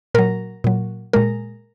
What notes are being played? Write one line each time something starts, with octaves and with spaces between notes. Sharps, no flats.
A#2 F#3 A#4
A#2 F#3
A#2 G#3 A#4